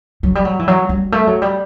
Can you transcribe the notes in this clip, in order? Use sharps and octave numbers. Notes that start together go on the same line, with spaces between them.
F#3
G3
F#3
E3
F#3
G3
A3
F#3
G3